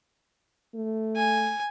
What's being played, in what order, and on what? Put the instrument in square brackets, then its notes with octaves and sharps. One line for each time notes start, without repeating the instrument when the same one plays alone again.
[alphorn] A3
[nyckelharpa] G#5